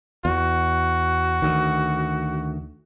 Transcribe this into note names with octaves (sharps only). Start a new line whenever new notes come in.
E2 F#4
D2 D#3